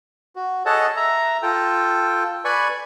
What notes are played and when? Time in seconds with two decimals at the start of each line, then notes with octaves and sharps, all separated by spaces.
0.36 F#4
0.66 G#4 A4 C#5 D#5 F#5 A5
0.97 E5 A#5
1.43 F4 A4 G5
2.45 B4 D5 G#5 B5 C#6